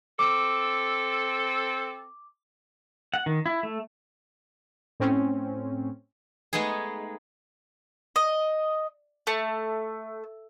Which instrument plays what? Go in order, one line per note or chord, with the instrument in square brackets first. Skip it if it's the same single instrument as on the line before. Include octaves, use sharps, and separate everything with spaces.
[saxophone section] C4 A4 [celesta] D6
[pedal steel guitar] F#5
D#3
E4
A3
[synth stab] A2 C4 C#4
[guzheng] G#3 A3 B3 D#4 G#4
[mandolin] D#5
A3